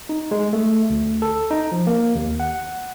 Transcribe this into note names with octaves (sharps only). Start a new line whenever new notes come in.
D#4
G#3
A3
D2
A4
D#4
F3
A#3
D#2
F#5